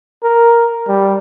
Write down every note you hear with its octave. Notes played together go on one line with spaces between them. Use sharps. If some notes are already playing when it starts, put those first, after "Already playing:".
A#4
G3